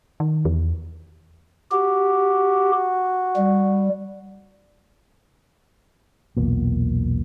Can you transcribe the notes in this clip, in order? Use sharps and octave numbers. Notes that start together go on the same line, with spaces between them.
D#3
E2
F#4 G4
G3
B1 E2 A#2